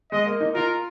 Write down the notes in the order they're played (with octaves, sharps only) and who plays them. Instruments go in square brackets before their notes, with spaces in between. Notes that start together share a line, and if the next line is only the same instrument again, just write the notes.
[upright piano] G#3 [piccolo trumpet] D#5
[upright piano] A#3
D#4
[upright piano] F4 [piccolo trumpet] A#4